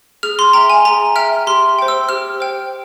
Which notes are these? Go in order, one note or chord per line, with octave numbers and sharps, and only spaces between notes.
G#4 F6
C6
E5 G5 A#5
G#5
G#4 A#5
E5 G5 F6
G4 C6
C5 G5
E6
G4 F6
C5 G5